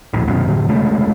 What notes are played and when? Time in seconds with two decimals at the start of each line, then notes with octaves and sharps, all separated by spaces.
0.13 D#1 A#1 A2
0.28 C2 F#2 B2
0.47 F1 A2 D3
0.68 F1 C#3 G#3 A3